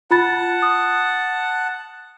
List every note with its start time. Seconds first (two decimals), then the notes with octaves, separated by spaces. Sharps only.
0.11 F4 F#5 A5 B5 A6
0.62 D#6